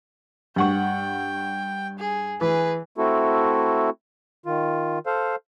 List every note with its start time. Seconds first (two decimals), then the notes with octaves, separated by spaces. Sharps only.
0.56 G2 F#5 G5 C#6
1.99 G#4
2.41 E3 G#4 B4
2.98 A3 C4 E4 F#4 A4
4.46 D#3 F4
5.06 A4 C5 F5